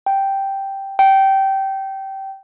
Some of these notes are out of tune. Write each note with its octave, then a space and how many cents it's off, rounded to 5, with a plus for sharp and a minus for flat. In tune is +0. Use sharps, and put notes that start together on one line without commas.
G5 -5
G5 -20